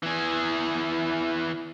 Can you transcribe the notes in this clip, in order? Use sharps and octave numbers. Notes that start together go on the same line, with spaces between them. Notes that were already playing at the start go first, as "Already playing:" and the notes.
E3 G#4